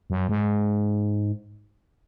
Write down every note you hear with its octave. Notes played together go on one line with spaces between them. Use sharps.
F#2
G#2